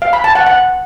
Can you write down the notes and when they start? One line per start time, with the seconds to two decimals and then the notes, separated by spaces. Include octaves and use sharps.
0.02 F5
0.13 B5
0.24 A5
0.35 F#5
0.47 F#5